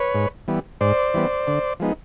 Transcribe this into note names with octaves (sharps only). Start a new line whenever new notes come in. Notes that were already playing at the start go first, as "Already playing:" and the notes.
Already playing: B4 C#5
G#2
E3 G3 B3
G#2 C5 D5
E3 G3 B3
D3
F3 G#3 B3 D#4